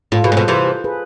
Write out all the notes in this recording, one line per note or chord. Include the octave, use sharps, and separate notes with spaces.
A2 F4 A4
B2 G#4 B4
A2
B2 A4 C5
C3 E3
G#4 B4